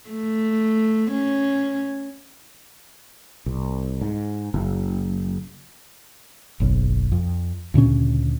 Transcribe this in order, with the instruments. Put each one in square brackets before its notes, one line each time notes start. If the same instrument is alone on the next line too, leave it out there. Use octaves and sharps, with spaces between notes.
[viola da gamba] A3
C#4
[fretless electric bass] C2
G#2
F#1
F#1 B1
F2
D2 A#2 C#3 C#4